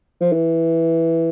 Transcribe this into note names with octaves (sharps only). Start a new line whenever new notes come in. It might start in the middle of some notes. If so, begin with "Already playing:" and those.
F3
E3